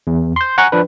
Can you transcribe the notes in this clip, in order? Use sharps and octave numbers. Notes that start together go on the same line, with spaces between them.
E2
C6 G6
F#5 G#5 A#5 C#6 F#6
F3 D4 B4